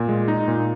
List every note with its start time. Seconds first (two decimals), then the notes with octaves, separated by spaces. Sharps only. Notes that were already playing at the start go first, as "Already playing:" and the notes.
Already playing: A#2
0.09 G#3
0.28 D#4
0.48 A#2